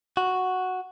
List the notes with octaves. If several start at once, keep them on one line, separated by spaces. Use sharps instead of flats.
F#4